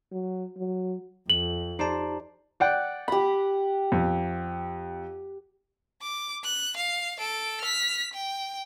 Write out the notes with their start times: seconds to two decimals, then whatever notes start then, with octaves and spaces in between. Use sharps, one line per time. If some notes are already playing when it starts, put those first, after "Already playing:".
0.12 F#3
0.58 F#3
1.30 F2 F#7
1.79 D#4 G4 C5 D5 A5 A#5
2.60 D5 F#5 G5
3.08 G4 F#5 B5
3.92 F2
6.02 D6
6.44 F#6
6.77 F5
7.19 A4 D7
7.61 F6 B6
8.14 G5